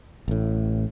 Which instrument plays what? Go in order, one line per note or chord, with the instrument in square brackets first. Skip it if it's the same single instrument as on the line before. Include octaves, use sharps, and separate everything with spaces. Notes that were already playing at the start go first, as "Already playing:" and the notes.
[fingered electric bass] A1 A2